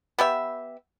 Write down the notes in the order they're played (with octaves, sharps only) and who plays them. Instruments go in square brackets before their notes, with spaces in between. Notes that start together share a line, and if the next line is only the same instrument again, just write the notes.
[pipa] B3 G4 E5